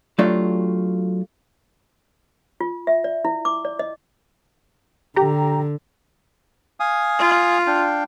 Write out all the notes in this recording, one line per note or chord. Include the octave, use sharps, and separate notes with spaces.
F#3 A3 D4 F4 G4 D5
F4
E5
D5
E4
D6
D5
D#5
D3 G4 A#5
F5 G#5 D#6
F4
D4 F5 G5